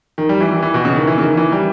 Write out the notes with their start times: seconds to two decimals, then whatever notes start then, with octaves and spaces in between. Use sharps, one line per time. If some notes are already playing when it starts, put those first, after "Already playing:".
0.18 D#3
0.29 G3
0.41 E3
0.51 E3
0.63 E3
0.74 B2
0.85 C#3
0.96 D#3
1.07 E3
1.18 C#3
1.22 D#3
1.37 E3
1.52 G3